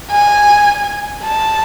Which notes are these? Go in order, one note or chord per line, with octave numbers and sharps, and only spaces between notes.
G#5
A5